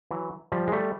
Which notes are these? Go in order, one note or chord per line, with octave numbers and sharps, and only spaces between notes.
E3 F#3
F3 G3
G#3
G3 A3